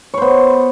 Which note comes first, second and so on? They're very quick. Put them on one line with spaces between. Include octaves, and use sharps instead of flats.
C#5 C5 B3